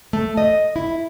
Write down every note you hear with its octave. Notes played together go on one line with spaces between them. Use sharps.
A3
D#5
E4